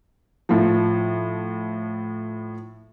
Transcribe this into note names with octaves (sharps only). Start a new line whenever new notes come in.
A2 F3